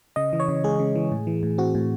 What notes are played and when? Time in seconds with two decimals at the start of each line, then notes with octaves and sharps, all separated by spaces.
0.16 C#3 D#5
0.33 E3
0.40 C#5
0.48 C#3
0.64 G#3 G#4
0.79 C#3
0.96 E3
1.11 A2
1.27 E3
1.43 A2
1.58 C4 F#4
1.75 A2